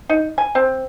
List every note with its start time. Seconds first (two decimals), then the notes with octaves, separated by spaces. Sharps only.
0.09 D#4
0.38 G#5
0.55 C4